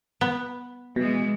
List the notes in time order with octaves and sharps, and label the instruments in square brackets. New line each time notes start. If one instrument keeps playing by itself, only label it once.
[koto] B3
[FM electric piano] B2 [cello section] E3 G#3